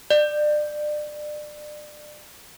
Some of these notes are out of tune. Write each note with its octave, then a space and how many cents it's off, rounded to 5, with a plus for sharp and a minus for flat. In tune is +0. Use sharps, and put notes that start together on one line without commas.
D5 +30